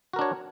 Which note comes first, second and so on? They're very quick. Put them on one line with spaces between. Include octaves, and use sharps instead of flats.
F#4 A#4 D4 C#5